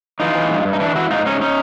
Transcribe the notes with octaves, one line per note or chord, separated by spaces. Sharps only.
E3 D#4 F4
E3
G2
G2
D#4
E3 D4 E4
E3 E4 F#4
G#2 D#4 F4
G#2 C#4 D#4
C#4 D#4